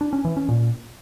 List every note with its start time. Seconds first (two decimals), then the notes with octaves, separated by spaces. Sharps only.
0.01 D4
0.13 C#4
0.25 E3
0.37 C#4
0.49 A#2